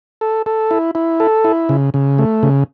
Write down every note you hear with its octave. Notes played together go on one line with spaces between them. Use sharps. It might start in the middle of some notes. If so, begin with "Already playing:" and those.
A4
A4
E4
E4
A4
E4
C#3
C#3
A3
C#3